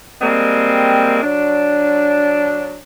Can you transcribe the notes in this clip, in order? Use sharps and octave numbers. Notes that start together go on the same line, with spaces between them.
G3 G#3 A#3 C4
F#3 D4